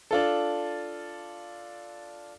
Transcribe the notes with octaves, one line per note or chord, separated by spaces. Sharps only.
D4 F4 A4